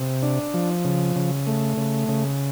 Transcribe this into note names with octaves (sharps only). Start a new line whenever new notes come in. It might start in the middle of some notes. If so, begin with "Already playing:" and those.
Already playing: C3
D4
F3
C#3
C#3
A3
C#3
C#3